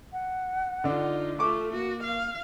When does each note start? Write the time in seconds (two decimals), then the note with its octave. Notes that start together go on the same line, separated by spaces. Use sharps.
0.13 F#5
0.84 D3 D4 D#4 F4
1.39 A3 F4 A4 C#6 D6
1.72 A#3 F#4
2.03 F5